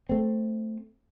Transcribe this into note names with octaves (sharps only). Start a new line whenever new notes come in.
A3 C4